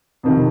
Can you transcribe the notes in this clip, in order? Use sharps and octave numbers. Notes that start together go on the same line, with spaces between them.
F2 C3 D#3